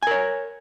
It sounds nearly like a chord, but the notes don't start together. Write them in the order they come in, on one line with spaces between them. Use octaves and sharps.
G#5 A#4 C#5